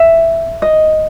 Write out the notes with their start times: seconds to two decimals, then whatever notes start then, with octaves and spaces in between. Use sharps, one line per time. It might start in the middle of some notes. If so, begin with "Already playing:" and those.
Already playing: E5
0.62 D#5